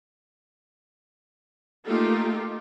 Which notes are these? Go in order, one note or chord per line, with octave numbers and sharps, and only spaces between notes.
A3 A#3 D#4 F4 G4 A4